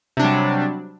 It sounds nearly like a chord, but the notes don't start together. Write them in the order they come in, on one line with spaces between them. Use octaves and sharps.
C3 D4 F#3 G3